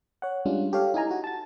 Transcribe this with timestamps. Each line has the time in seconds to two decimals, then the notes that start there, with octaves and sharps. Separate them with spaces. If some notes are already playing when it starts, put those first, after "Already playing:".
0.22 C#5 F#5
0.45 G3 G#3 C#4 D4 F4
0.73 G4 A4 C#5 F5
0.94 D#4 E4 G#5 A#5
1.11 F#4
1.24 A5 A6